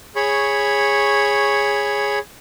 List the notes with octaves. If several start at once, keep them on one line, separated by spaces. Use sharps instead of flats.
G#4 C#5 B5 C#6